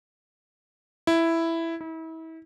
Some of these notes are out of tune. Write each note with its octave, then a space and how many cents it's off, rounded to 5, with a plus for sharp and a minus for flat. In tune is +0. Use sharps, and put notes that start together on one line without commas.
E4 +5
E4 -35